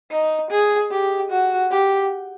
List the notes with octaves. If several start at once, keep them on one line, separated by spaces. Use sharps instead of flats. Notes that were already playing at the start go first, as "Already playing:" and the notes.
D#4
G#4
G4
F#4
G4